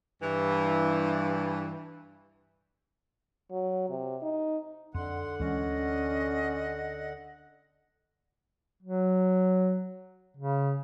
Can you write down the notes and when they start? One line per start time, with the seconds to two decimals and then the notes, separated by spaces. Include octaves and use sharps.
0.23 G2 E3
3.51 F#3
3.90 C3
4.22 D#4
4.94 F2 D3 F#5 C6
5.39 D2 E3 G#3 C#4 D#5
8.83 F#3
10.37 C#3